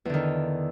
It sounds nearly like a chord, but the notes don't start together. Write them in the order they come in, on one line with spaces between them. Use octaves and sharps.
E2 D3 D#3